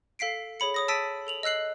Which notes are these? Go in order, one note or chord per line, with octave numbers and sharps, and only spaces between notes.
A4 F5 B6 C7 D7
G#4 C#5 B5 C#7
C#5 D#6 A#6
A5 E6 A6 B6 D7 D#7
A4 F7 F#7
D#5 E6 F#6 C7 F#7